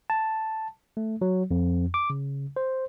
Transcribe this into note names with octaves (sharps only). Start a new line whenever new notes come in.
A5
A3
F#3
F2
D6
C#3
C5